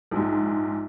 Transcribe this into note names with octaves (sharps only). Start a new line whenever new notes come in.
A#1 G#2